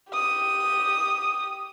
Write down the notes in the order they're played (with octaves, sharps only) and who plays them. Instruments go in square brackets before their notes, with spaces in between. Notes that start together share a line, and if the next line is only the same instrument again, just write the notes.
[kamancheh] G4 D#6